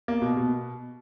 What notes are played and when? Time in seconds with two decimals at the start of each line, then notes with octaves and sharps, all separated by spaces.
0.08 A#3
0.22 B2
0.37 B2